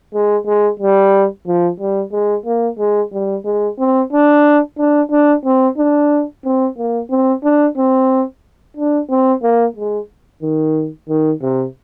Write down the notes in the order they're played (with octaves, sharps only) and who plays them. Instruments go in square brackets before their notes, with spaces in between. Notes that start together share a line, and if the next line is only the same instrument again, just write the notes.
[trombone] G#3
G#3
G3
F3
G3
G#3
A#3
G#3
G3
G#3
C4
D4
D4
D4
C4
D4
C4
A#3
C4
D4
C4
D4
C4
A#3
G#3
D#3
D#3
C3